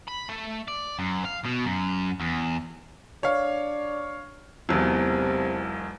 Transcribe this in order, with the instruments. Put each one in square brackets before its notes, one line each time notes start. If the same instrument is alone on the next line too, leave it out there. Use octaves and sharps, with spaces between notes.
[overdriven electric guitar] B5
A3
D5
F#2
F5
B2
F#2
E2
[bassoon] D4 [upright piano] C#5 F5
[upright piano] E1 B1 E2 [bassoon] C3